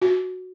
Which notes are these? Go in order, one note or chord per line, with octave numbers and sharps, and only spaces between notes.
F#4